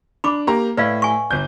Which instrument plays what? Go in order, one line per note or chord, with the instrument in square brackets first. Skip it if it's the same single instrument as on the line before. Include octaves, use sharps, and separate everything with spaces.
[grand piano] D4 [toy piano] B5 D6
[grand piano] A#3 G4 A#5
[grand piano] A2 [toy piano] B4 D5 F5
[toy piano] G#5 C#6
[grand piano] G1 G6